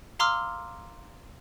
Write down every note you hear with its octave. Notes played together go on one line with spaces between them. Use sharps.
F5 A#5 C6 D6 E6 F6